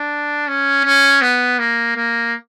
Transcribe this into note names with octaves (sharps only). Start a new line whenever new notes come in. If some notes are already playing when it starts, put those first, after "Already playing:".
Already playing: D4
C#4
C#4
B3
A#3
A#3